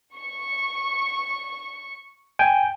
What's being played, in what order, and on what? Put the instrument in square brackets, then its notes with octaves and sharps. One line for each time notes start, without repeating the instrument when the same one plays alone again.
[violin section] C#6
[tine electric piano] G5 G#5